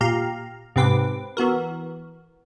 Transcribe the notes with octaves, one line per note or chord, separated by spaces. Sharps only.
A#2 G4 F5 A#5
G#2 C3 C4 B4 D6
E3 B3 F#4 A#4